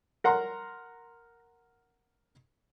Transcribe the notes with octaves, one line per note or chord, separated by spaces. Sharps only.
A#4 F#5 A#5 C6